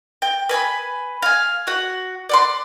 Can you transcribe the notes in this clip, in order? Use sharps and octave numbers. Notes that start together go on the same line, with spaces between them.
G5
B4 G#5 A5 B5
F5 G#5
F#4 F#5
D5 F#5 C6